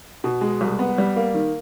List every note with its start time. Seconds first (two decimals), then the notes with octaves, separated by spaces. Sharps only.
0.24 B2
0.41 G#3
0.61 C2
0.79 B3
0.98 G3
1.16 A#3
1.34 D#3